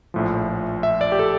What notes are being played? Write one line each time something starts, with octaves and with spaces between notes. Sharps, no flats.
A#1 A2 F3
E5
D5
G4
A4